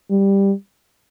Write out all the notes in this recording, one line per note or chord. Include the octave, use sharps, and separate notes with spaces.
G3